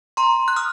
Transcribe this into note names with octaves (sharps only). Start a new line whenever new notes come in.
A#5 C6
F#6
D#6 F6